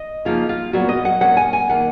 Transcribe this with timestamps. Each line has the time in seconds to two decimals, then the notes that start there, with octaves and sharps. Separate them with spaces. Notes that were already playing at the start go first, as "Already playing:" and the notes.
Already playing: D#5
0.25 C#3 F3 A#3 D#4 F4
0.49 F4
0.73 A#2 F#3 B3 F#4
0.89 D#5
1.05 F#5
1.21 A#2 F#3 C#4 F#5
1.37 G#5
1.53 G#5
1.69 D#3 A#3 F#5